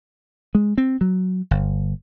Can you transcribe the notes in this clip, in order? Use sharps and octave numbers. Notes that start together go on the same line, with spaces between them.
G#3
C4
F#3
G1